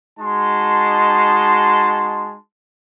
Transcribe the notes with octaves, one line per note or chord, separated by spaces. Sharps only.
G#3 D#4 F#4 A5 C6